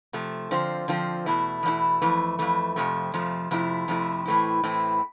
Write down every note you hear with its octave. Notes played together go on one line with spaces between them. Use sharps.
C3 F3 A3
D3 F3 C4 F4 C5
D3 F3 C4 F4 C5
E2 B2 A3 E4
E2 B2 A3 E4
F2 E3 A3
F2 E3 A3
F2 C3 F3 A3
F2 C3 F3 A3
F2 C3 F3 A3 E4
F2 C3 F3 A3 E4
A2 E3 A3 C4 E4
A2 E3 A3 C4 E4